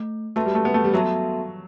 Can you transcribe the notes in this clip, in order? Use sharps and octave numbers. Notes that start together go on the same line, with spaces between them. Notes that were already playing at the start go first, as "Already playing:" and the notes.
Already playing: A3
A3 F#4 B4 E5 A5
G3
A3
B3
A3
G3
F#3 B3 F#4 A4 E5 A5